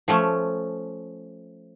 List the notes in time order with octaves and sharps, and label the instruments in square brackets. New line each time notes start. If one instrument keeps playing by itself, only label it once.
[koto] F3 A3 C#4